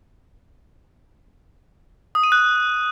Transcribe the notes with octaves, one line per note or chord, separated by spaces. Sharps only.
D#6
D#7
F#6